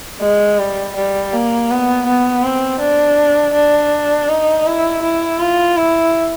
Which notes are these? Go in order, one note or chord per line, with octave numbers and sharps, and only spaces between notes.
G#3
G3
G3
A#3
B3
B3
C4
D4
D4
D#4
E4
E4
F4
E4